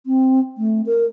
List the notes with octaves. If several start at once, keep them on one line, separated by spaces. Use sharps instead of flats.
C4
A3
A#4